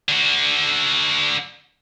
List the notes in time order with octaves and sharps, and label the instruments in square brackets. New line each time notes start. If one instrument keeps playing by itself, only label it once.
[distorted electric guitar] D3 F#4